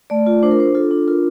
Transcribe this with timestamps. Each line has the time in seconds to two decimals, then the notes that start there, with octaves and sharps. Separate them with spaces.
0.10 A3 D5
0.27 F4
0.43 D4 C5
0.51 A#4
0.59 D4 C5
0.75 F4 A4
0.91 D4
1.08 F4 A#4